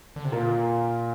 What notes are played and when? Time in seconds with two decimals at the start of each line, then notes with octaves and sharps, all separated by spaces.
0.16 D3
0.24 C3
0.32 A#2 F4 A#4